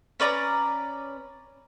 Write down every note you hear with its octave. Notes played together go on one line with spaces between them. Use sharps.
C#4 B4 D5 A#5